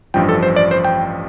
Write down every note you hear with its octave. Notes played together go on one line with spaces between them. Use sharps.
A1 G2 F3 G5
A4
C5
D5
C5
G5